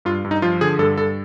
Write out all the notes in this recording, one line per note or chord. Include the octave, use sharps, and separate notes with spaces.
G2 F4
G2
D#4
F3 F4
D3 G#4
G2 A4
G2 A4